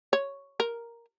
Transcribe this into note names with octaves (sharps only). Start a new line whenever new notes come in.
C#5
A#4